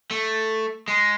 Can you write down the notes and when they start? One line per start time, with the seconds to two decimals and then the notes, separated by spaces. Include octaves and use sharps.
0.11 A3
0.88 G#3